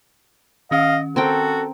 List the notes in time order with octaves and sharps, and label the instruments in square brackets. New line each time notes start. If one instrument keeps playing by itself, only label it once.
[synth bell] D#3 C#4 [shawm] D#5 [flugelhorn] F5
[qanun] C4 A#4 G5 [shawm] F#4 [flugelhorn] A4